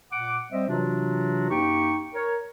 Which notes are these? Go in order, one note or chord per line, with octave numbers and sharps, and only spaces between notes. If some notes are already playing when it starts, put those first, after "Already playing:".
A#2 F#5 D6
G3 C4 C5 D#5 E5
C3 E3 F#3 D4 F4 F#4
F#2 A#3 D#4 G4 G5 C#6
A#4 C#5